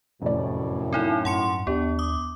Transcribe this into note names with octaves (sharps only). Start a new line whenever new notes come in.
F1 F#2 A2 D5
C4 D#4 E4
G2 F#5 A5 C6 C#7
D#2 B3 D4 G4
D6 D#6